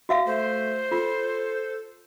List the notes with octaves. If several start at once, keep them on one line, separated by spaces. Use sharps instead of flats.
F#4 E5 F5
A3 C5
F4 A4